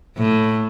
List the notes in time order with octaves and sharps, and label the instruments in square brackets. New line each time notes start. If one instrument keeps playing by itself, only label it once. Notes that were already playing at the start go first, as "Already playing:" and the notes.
[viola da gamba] A2